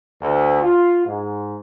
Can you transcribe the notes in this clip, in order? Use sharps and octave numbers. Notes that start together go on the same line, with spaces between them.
D2
F4
G#2